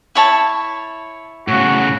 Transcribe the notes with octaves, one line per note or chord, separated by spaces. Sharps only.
E4 C#5 A5
A2 C#3 F#4